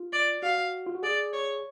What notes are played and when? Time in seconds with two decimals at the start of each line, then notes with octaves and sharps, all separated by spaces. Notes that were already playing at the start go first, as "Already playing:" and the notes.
Already playing: F4
0.13 D5
0.43 F#4 F5
0.86 F4
0.95 F#4
1.03 G#4 D5
1.33 C#5